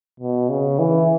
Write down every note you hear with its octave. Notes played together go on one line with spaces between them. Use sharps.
B2
C#3
E3